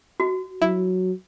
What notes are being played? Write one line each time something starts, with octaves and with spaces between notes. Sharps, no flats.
F#4
F#3 E4